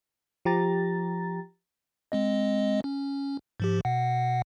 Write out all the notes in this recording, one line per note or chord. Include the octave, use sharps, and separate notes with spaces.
F3 G4 A#5 A6
G#3 C4 D#5
C#4
G#2 F3 G4
B2 F#5